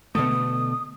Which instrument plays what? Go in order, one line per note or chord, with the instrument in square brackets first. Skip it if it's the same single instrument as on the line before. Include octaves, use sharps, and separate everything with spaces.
[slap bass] B2 D3 A3 [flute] D#6